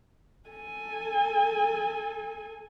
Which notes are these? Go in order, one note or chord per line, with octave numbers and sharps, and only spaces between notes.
A4 G#5